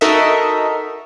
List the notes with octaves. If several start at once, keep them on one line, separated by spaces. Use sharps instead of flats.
D#4 F#4 A4 A#4 D#5 E5